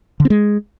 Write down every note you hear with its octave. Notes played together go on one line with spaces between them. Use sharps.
D3
C4
G#3